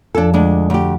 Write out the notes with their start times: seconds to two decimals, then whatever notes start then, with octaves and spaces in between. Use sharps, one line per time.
0.15 F2 F3 D4 A4
0.34 D2 G#3 D4
0.70 D2 G4